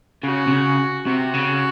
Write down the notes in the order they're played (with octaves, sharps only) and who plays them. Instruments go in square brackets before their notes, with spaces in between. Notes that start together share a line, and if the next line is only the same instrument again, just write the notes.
[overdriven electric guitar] C#3 [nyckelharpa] F#4
[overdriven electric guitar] C3
C#3
[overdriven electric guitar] C3 [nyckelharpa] F#4
[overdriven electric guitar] C#3